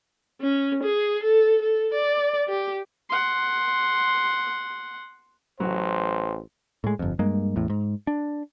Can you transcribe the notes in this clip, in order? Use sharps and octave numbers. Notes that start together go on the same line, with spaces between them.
C#4
G#4
A4
A4
D5
G4
F#5 C6
A1 F#3 C5
A2 G#3
G1 F2
G2 G#3 A#3
A1 E2 A2
G#2
D4